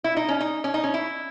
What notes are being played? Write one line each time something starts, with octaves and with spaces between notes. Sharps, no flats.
E4
D#4
C#4
D#4
C#4
D#4
C#4
E4